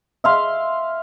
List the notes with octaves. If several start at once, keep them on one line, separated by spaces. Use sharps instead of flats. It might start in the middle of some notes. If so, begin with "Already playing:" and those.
E5 F5 C6